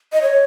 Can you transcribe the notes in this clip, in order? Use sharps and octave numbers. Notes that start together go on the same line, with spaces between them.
D#5
C#5